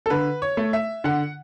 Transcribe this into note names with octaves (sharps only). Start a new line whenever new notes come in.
A4
D3 B4
C#5
A3
E5
D3 F#5